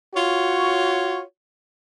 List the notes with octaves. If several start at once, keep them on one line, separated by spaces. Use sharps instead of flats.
F4 F#4 C#5